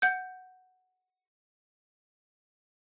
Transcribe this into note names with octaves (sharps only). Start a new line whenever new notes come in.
F#5 G6